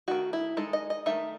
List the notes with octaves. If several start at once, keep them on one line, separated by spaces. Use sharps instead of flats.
D#3 A3 D#4 F#4
E4
G#3 D#4 A4
D#5
D#5
D#3 A3 D#4 E5